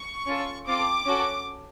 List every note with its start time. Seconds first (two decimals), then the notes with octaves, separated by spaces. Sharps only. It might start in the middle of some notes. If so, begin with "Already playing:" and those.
Already playing: C#6
0.25 C#4 F4 A4
0.66 C4 F4 A4 D6
1.05 C#4 F#4 A4